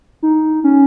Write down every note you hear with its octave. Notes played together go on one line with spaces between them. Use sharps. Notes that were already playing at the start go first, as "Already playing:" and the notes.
D#4
C#4